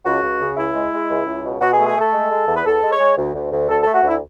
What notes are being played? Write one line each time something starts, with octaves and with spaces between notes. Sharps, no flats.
C#2 F#4
C#2
C#3
C#2 E4
G#3
G#3
C#2
C#2
B2
B2 F#4
G#4
A3
G#4
A3 A4
G#3
G#3
E2
B4
E2 A4
G#3
C#5
G#3
D2
D2
D2
D2 A4
A3 A4
F#4
D2 E4